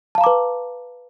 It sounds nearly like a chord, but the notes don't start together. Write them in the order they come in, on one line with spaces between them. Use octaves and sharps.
A5 F5 A#5 D6 B4